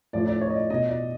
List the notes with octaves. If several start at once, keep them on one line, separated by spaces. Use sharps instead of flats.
A2 F3 D5
D5
C#5
D#5
D5
B2 D#5
D5